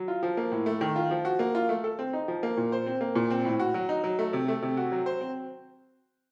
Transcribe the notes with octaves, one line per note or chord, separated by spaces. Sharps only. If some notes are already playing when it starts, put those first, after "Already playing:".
Already playing: F#3
F4
F3
A#3
A2
A3
D#3
F4
F3
F#4
A#3
F4
A3
A4
C4
D#4
F3
A#3
A#2
C5
C4
A#3
A#2
C4
A2
F#4
F#3
D#4
F#3
A3
C3
A3
C3
F#4
F#3
C5
C4